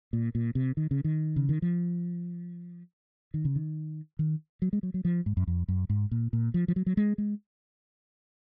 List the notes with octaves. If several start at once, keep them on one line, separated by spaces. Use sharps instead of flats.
A#2
A#2
C3
D#3
C#3
D#3
C#3
D#3
F3
D#3
C#3
D#3
D#3
F#3
G#3
F#3
F#3
F3
G#2
F#2
F2
F#2
G#2
A#2
A#2
F3
F3
F#3
F#3
G#3
G#3